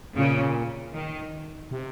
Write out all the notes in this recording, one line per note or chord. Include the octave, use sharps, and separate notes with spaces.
A#2 C#3
D#3
C3